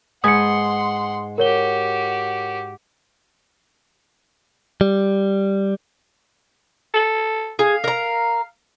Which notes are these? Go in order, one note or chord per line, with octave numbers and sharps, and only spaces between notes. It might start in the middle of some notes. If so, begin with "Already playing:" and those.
G#2 B4 F#5 G#5 C6 D#6 C#7
F#4 G4 A#4 C#5 G7
G3
A4
G#4 F5
A#4 A#5